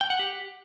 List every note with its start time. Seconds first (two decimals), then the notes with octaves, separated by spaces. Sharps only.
0.01 G5
0.10 F#5
0.19 G4